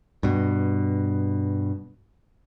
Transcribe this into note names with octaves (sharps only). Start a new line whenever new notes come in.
G2 B2